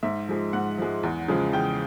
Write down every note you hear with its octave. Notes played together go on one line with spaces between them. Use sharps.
G#2 E5
F3 G#3
G#2 F#5
F3 G#3
E2
C#3 F3 G#3
E2 G5